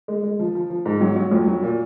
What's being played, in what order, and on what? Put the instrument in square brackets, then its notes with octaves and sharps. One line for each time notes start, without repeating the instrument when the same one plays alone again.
[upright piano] G#3
G#3
F3
F3
F3
G#2
F#3
F#3
F2
F#3
A#2